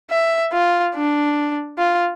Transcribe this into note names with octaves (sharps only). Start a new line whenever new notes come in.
E5
F4
D4
F4